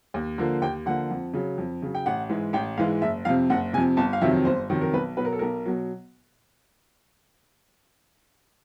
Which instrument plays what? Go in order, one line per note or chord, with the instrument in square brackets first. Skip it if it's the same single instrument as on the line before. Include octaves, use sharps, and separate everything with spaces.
[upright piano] D#2
D3 F3 A#3
D#2 G5
D3 F3 A#3 F#5
F2
C#3 F#3
F2
C#3 F#3
G5
A1 F#5
G#2 E3 G#3
A1 G5
G#2 E3 G#3 F5
F#1 E5
F2 C3 F5
F#1 F#5
C3 G#5
F2
G1 A5
F5
F2 C3 D#3 F#3 E5
G1 C5
F2 C3 D#3 F#3
A#4
B1 B4
B2 F#3 B4
A#4
A4
B1 A#4
B2 F#3